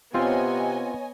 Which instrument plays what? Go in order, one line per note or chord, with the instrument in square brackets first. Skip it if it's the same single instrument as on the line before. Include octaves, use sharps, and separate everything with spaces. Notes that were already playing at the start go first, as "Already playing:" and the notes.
[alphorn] C3 [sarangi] B3 [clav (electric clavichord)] C4 F4 [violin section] C#5 D#5 G#5